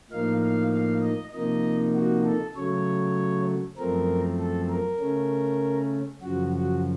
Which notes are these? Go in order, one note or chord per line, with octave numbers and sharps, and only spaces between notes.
A2 F3 A#3 D#4 F5
F5
F5
D#5
C3 F3 A#3 D#4 D#5
F#4
A4
C#3 F#3 A3 C#5
F#2 F3 A3 C4 A#4
A4
A#4
C#3 A3 C#4
F#2 C#3 F3 F#4
F#4